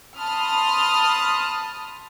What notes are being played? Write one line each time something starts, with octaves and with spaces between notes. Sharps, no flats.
A5 B5 C6 D#6 F6